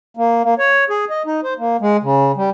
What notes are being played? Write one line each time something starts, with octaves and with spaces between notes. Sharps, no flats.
A#3
A#3
C#5
G#4
D#5
D#4
C5
A#3
G#3
C#3
G3